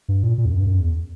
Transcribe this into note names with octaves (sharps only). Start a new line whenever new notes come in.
G2
A#2
A#2
E2
F#2
G2
F#2
E2